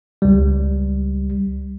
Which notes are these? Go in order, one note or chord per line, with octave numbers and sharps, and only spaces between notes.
C#2 G3